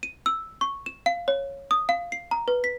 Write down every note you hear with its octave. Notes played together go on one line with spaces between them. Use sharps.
D#7
E6
C#6
E7
F5
C#5
D#6
F5
C7
A#5
B4
B6